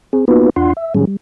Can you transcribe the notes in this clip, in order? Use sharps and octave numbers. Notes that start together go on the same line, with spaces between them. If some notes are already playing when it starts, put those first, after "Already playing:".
C4 G#4
A#3 B3 D#4 F4 F#4 B4
E2 D4 F4 F#5 C6
E5
A2 D#3 F#3 G3 C#4 G#4
G3